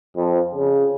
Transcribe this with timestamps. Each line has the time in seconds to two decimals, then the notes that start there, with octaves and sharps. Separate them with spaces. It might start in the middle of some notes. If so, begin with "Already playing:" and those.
0.16 F2
0.55 C#3